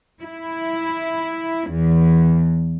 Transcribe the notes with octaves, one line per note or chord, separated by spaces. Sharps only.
E4
E2